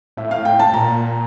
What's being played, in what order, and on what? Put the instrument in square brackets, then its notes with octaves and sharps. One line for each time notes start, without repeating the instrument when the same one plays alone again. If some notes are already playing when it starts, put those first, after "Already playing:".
[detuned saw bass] A2 [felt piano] E5
[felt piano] F5
G5
A5
[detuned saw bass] A#2 [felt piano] A#5